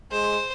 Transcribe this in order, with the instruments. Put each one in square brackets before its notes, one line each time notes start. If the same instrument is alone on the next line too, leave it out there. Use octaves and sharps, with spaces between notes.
[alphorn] G#3 [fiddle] C5